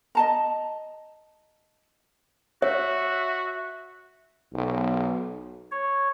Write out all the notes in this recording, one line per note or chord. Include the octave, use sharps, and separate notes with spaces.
D#5 A5 A#5
F#4 C#5 E5
B1
C#5